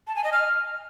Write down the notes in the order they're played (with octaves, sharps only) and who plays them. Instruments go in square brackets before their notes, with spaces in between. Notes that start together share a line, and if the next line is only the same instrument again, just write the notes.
[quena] A5
G#5
D#5
F6